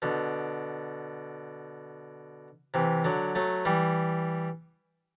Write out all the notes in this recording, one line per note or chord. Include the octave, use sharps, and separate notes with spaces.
B2 D3
C3 E3
D3 F#3
F#3 A3
E3 G3